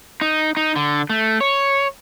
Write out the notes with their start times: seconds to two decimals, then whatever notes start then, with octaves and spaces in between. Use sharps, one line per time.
0.21 D#4
0.57 D#4
0.76 D3
1.10 A3
1.41 C#5